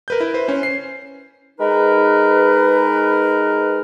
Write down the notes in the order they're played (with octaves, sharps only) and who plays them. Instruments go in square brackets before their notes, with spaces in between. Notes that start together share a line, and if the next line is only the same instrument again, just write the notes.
[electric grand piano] A#4 B4 G6
E4
B4 C5
C#4 C5
C7
[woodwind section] G#3 D#4 A#4 B4